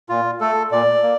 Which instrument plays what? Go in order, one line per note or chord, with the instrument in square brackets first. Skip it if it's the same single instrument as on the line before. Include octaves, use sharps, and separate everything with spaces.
[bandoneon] A#2 F4
A3 A4
A#2 D5
A#3